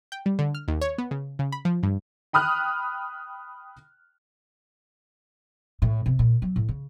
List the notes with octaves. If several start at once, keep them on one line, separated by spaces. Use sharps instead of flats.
G5
G3
D3
F6
D#2
C#5
B3
C#3
C#3
B5
F3
G2
G5 B5 D#6 F6 F#6
A2
C3
A#2
F#3
A2
C#3